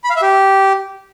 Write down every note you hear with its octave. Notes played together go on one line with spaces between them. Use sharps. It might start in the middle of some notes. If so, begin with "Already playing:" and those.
B5
F5
E5
G4